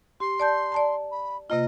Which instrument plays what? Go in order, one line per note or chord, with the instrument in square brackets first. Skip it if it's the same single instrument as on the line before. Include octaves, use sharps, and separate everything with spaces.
[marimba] G4 [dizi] C6
[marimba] D5 A5 G6
D5 A5 A#5
[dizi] B5
[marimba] C3 A#3 F4 [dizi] D#5